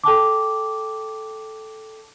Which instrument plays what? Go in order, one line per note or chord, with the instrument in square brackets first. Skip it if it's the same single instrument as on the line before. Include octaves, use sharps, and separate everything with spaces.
[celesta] A4 G5 A5 D6